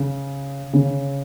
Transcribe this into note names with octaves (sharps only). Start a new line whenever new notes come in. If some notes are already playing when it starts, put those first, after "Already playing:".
Already playing: C#3
C#3